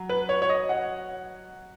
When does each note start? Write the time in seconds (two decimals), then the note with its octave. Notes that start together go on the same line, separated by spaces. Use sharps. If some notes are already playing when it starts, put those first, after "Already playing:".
Already playing: F#3
0.09 B4
0.29 C#5
0.42 C#5
0.49 D#5
0.69 F#5